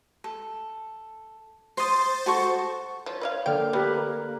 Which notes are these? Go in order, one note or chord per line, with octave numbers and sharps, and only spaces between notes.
A4
C5 C6 D#6 A6
F#4 A4 C#6
F3 C#5
B4 D#5 F5
D3 A#3 G5 F6
A3 G4 B4